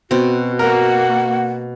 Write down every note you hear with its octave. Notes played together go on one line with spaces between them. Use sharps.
B2 C4 F#4
A#3 F#4 A#4 F#5